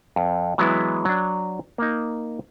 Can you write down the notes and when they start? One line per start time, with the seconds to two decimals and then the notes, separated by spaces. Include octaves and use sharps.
0.16 F2
0.58 E3 F#3 G#3 B3 E4
1.05 F#3 D4
1.78 A#3 D#4